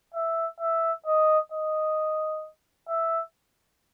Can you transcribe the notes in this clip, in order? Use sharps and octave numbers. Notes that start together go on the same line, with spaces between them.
E5
E5
D#5
D#5
E5